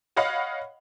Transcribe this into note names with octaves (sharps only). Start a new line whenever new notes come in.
C#5 D#5 F5 F#5 B5